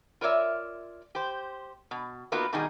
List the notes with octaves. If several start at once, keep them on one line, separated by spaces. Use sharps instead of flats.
F4 A#4 C#5 D5 E5
G4 C5
B2
A#3 B3 D#4 F4 F#4
B2 D#3 G3 D#4 G#4